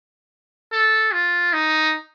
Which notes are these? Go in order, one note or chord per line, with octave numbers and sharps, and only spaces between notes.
A4
F4
D#4